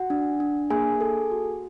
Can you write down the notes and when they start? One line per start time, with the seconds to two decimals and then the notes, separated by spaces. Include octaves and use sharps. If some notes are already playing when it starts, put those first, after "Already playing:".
Already playing: F#4 F#5
0.10 D4
0.40 D4
0.70 A#3 G#4 G#5
1.01 A4
1.32 F#4